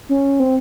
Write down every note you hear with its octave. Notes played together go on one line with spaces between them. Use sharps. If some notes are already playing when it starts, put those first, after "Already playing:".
C#4
C4